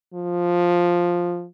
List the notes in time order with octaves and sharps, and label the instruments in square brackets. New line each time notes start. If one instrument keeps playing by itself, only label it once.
[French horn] F3